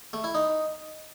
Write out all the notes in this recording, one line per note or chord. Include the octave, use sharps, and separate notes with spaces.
A3
E4
D#4